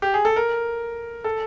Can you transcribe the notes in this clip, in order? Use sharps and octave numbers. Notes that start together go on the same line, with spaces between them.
G4
G#4
A4
A#4
A4